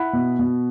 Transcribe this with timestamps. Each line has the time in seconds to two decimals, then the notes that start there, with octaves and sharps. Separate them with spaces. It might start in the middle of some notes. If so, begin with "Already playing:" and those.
Already playing: E4 F#5 B5
0.13 B2
0.39 B2